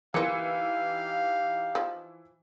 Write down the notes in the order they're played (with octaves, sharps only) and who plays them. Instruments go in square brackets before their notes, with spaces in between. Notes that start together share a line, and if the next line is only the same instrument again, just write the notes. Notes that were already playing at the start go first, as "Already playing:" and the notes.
[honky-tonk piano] E3 C#7 [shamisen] A#3 F4 [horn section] D#4 G4 F5
[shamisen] F3